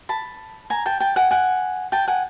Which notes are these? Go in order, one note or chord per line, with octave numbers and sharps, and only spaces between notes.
A5 B5
G#5 A#5
G5 A5
G5 A5
F#5 G#5
F#5 G#5
G5 A5
F#5 G#5